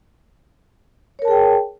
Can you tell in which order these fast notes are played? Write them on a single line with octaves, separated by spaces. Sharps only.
C#5 A#4 A5 G#4 G5